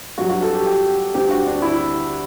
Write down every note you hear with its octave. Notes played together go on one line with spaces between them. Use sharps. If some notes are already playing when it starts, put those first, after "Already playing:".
G2 F#3 F#4
F#4
A4
G4
G4
D2 D3 G3 G4
F#4
D4
E4